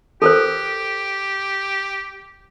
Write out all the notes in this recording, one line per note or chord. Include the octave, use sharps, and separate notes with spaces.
G4 A4 A#4 C5